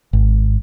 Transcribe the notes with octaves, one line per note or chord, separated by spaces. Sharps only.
G#1